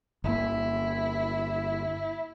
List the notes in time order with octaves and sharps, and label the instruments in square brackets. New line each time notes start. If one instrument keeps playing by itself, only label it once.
[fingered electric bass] G1 A#3 [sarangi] E4